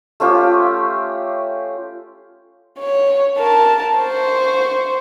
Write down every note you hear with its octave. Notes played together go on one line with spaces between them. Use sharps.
A3 C#4 F4 G4
C#5
A#4 A5
C5 C#6